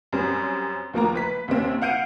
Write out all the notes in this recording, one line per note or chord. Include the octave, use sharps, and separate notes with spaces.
F#2 G3 C4 C#4
D#2 F3 A#3 A#5
B4 B6
D#2 C3 C4 C#4
F5 F#5 G6 D7 D#7